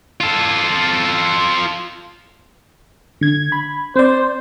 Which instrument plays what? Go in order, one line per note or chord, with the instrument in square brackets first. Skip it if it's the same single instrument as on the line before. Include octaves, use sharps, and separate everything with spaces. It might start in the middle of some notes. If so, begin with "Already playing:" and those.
[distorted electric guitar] F4 A4
[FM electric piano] D3 G#6
B5
[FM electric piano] C4 D5 [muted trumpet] C5